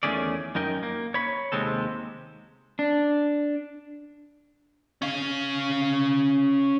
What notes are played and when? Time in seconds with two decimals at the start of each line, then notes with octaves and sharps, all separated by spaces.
0.03 E2 D#3 A3 C#4 G#4 D5
0.55 F#2 D#4 A#4 G5
0.83 A#3
1.14 C#5 B5
1.52 D#2 C3 G#3 C4 A4
2.79 D4
5.02 C#4 F5